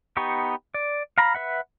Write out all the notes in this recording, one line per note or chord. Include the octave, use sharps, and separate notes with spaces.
B3 D#4 G4 C#6
D5
F5 A#5 B5
B4 E5 F#5